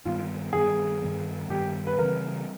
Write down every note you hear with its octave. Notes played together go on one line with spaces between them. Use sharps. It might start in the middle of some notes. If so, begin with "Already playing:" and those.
G2 D#3 G3 B3 F4
G2 D#3 G3 B3 G#4
G2 D#3 G3 B3
G2 D#3 G3 B3 G4
B4
C#3 E3 G3 C4 A#4